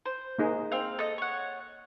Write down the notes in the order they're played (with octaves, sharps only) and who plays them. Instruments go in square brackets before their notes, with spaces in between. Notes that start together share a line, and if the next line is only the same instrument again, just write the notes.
[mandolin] C5
[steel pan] A#3 D#4 G#4
[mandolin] C4 F5
A4 D#5
C#5 F#5